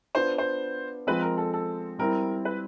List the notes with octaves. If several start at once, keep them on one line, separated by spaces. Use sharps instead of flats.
B3 D4 F4 C5
C5
F3 G#3 C4 B4
A#4
A4
A4
G3 C4 E4 A#4
B4